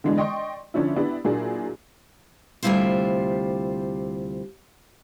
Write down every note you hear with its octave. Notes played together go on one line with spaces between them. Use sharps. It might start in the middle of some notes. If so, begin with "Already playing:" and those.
D3 E3 G#3 B3 D4
D5 D#5 G5 C6 C#6
D3 F3 C#4 D4 E4
B3 D4 E4 G4
A#2 F#3 A#3 D4 E4 G#4
D2 C3 G3 E4 F4 C5